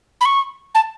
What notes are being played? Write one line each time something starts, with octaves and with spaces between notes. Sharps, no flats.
B5
C#6
A5